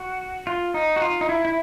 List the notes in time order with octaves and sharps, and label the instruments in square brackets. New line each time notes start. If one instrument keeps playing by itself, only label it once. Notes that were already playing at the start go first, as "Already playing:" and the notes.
Already playing: [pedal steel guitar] F#4
F4
D#4
F#4
F4
D#4
E4
E4